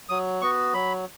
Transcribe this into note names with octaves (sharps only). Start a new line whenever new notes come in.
F#3 D#6
B3 F#4 C#6
F#3 B5